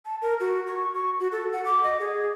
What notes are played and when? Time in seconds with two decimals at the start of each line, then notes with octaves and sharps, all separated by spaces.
0.05 A5
0.22 A#4
0.40 F#4
0.67 C#6
0.94 C#6
1.20 F#4
1.32 A4
1.53 F#5
1.65 D6
1.83 D#5
2.00 G#4